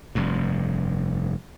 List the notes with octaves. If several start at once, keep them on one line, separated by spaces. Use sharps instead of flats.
F1 G2